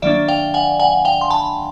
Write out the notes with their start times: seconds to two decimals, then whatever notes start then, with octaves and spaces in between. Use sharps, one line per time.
0.02 D#3 F#3 A#3 D4 D5 E5
0.28 F5 G5
0.54 F#5 G#5
0.79 F#5 G#5
1.05 F5 G5
1.21 C6
1.30 A5 B5